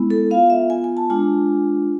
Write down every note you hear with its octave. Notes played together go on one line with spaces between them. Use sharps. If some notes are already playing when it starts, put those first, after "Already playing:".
Already playing: G#3 B3 E4
A4
B3 F4 F5
E5
G#5
G#5
A5
G#3 D4 F4 G#5